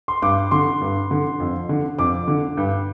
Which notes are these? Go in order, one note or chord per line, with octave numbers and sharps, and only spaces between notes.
C6
G2 D6
D3 C6
G2
D3
F2
D3
F2 D6
D3
G2